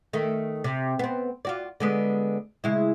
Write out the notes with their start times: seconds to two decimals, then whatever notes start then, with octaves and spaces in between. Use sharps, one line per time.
0.13 D#3 A3
0.64 C3
0.99 B3 C4
1.45 F4 F#4 D5
1.80 D3 G#3 B3
2.64 C#3 G#3 E4